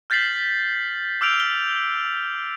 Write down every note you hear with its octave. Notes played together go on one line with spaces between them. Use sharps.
F6 G6 A6 B6 C7 F#7
D6 E6 F6 G6 D7 F7
F6 G7